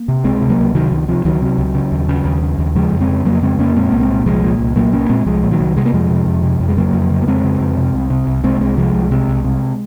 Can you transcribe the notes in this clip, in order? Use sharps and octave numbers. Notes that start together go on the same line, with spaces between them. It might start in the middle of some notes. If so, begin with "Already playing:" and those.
Already playing: A#3
C3
C#2 G#3 C4
C3
F#3 A#3
C#2
C3 D#3 F#3
C#2 D#3
C3 F3
C#2 D#3 F#3
C3
C#2
C#3
D#2
C#3
D#2
C#3
D#2
C#3 F3 G#3
F2
G#3 C4
C#3
F2 F#3 A#3
C#3 G#3 C4
F2 A#3 C#4
A#2 G#3 C4
C2 A#3
G#3 C4
A#2
C2 F3 G#3
A#2
C2
A#2 F#3 A#3
C2 A#3 C#4
A#2 G#3 C4
C2 F3 G#3
A#2
D#3 F#3
C2
C3 G#3
A#3
F2 F3 G#3
C3
F2
C3
F2
G#3
C#3 F#3 A#3
F2
C#3
A#3
F2 G#3 C4
C#3
F2
C3
C2
C3
C2
C3 G#3 C4
C2 G#3 C4
C3 F3 G#3
C2
C3
C2
C3